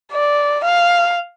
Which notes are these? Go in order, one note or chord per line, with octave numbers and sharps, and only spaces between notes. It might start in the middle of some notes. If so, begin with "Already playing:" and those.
D5
F5